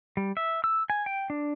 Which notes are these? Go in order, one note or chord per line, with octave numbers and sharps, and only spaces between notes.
G3
E5
E6
G#5
G5
D4